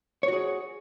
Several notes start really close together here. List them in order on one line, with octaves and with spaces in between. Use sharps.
C#5 F#4 G#4